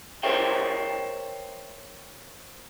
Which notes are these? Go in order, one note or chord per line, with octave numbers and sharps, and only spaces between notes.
A#4 C5 C#5 E5 G5